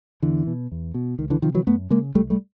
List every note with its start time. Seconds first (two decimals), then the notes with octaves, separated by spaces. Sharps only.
0.22 E2 D3 E3
0.47 B2
0.72 E2
0.94 B2
1.19 C#2 D#3
1.30 D3 E3
1.42 C3 D#3 F3
1.55 E3 F#3
1.67 F#2 A3 B3
1.90 C#3 G#3 A#3
2.15 C2 G3 A3
2.30 G3 A3